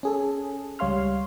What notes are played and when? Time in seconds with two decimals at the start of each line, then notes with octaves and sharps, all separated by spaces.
0.03 C#4 G#4 A4
0.79 C#2 G3 C#5 F5 C6 F6